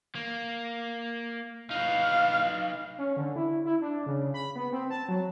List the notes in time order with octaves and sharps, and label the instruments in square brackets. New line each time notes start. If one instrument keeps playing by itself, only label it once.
[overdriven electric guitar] A#3
[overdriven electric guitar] D#4 B4 [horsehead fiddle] F5
[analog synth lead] C#4
D3
E4
E4
D4
C#3
B5
B3
C4
A5
F#3